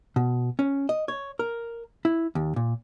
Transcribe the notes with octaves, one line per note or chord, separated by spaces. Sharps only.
B2
C#4
D#5
C#5
A#4
E4
D#2
A#2